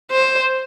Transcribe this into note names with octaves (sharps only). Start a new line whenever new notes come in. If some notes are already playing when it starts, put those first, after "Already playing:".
C5